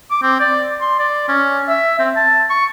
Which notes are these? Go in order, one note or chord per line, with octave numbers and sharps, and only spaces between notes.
D6
C4
D5
C6
D5
C#4
E5
C4
A5
C#6